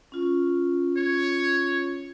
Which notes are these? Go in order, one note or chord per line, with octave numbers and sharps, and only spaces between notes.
C#4 F4
C#5